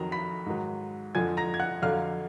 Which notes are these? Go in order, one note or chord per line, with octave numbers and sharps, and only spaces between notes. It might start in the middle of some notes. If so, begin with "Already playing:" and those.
Already playing: F2 D#3 F#3 A#5
B5 B6
G#2 D#3 F#3
F2 D3 F3 G#5 G#6
A#5 A#6
G#6
F#5 F#6
F2 D3 F#3 F5 F6